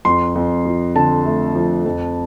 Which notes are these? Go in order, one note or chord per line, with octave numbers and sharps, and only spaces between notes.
F2 C6
F2
F3
D3 A5
A3
F3
F2